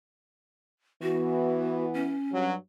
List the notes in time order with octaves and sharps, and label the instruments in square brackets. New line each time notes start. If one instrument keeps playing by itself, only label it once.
[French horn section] E3 B3 [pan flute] F#4
[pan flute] C#4
[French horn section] G2 F#3